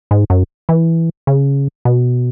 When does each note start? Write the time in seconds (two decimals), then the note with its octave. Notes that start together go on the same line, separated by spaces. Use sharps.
0.11 G#2
0.30 F#2
0.69 E3
1.27 C#3
1.85 B2